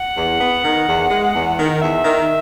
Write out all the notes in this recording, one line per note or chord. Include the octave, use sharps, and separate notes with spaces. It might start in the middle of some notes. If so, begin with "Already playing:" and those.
Already playing: F#5
E2
B3
D#3
E2
G#3
E2
D#3
E2 E5
D#3